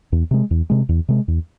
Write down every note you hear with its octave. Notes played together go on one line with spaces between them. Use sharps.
E2
C3 G#3
E2
C3 G#3
E2
C3 G#3
E2